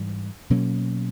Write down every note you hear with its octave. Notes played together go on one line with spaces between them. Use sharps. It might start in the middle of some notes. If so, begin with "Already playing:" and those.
Already playing: G#2 E3 G3
B2 F#3 A#3 C#4